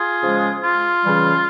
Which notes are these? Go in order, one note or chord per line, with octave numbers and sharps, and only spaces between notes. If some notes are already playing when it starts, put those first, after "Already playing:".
Already playing: F4 G#4
C#3 F3 G#3
F4
C#3 E3 G3